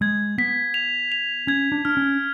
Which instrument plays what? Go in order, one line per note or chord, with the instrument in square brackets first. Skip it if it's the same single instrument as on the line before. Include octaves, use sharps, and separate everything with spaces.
[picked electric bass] G#3 [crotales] G#6
[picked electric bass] B3 [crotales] B6
[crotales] F7
F7
[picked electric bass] C#4 [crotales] G#6
[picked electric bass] D4
[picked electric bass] D4 [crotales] F6
[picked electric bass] C#4